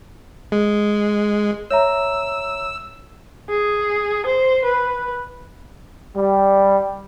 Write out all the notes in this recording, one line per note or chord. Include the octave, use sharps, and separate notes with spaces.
G#3
C#5 E5 A#5 E6
G#4
C5
B4
G3